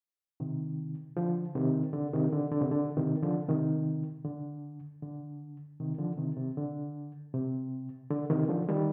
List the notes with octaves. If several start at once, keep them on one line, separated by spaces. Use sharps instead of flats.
C3 D#3
D3 F3
C3 D#3
D3
C3 D#3
D3
D3
C3
D3
C3 D#3
D3 F3
C3 D#3
D3
D3
C3 D#3
D3 F3
C3 D#3
C3
D3
C3
D3
C3 D#3
D3 F3
D#3 G3